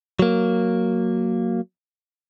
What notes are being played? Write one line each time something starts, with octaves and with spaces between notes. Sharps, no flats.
F#3 A#3